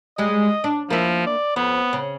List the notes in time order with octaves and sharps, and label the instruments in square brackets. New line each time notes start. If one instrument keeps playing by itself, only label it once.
[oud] G3 G#3 [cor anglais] D#5
[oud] D4
[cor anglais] F3 [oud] A#3 E4
[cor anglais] D5
[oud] F2 [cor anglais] B3
[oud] C#3